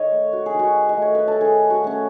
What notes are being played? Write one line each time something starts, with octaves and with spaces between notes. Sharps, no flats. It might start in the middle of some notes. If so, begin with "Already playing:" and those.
Already playing: D#3 C#5 D#5
A3
F#4
G#4
D#3
F#4
D#5
A3 C#5
B4
A4
D#3 G#4
F#4
A3 C#4